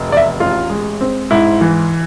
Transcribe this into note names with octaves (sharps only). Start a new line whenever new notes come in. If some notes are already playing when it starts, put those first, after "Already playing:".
Already playing: F1
E2 D5
E5
A1 F4
G#3
C4
G#2 E4
E3